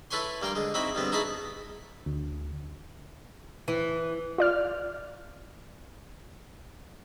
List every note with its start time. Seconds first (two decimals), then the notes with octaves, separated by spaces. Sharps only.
0.11 E4 A4 B4 C#5 G#5 C6
0.42 G2 A#3 G5 C6
0.56 D3 G#3
0.74 C4 D#4 E4 F#4 B5
0.95 G2 D3 B3 C4
1.12 D#4 E4 F#4 G#4 A5 B5
2.06 D2
3.68 E3
4.38 F4 D5 F6